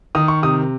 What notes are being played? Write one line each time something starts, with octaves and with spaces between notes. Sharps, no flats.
D#3 D#6
C#6
C3 D#6